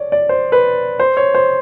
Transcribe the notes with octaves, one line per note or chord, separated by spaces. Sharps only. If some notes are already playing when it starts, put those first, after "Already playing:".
Already playing: C#5 D5
D5
C5
B4
C5
C#5
C5